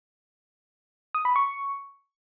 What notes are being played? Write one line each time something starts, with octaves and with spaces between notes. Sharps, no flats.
D#6
B5
C#6